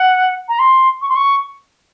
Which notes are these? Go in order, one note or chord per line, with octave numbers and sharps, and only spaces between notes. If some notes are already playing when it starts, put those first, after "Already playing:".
Already playing: F#5
A#5
C6
C#6
C6
C#6